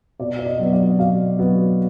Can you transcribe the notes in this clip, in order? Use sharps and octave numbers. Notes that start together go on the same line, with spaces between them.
B2 D5
D5
D#5
F#3 B3
D5
B2 F5
F#3 B3